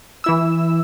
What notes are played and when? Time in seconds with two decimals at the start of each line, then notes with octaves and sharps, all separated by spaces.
0.24 E3 E4 E6